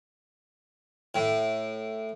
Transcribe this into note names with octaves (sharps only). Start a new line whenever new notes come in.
A2